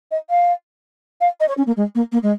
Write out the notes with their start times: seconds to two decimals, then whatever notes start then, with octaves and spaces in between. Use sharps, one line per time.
0.11 D#5
0.30 F5
1.21 F5
1.40 D#5
1.48 C#5
1.57 C#4
1.67 A#3
1.77 G#3
1.95 A#3
2.12 A#3
2.23 G#3